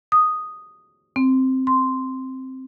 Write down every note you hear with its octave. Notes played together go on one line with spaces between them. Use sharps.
D#6
C4
C6